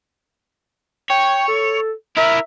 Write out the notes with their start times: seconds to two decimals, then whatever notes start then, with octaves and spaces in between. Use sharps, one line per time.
1.10 C#5 G5
1.48 A4
2.17 E4 A#4 E5